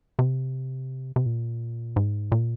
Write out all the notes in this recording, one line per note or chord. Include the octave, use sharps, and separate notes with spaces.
C3
C3
A#2
G#2
A#2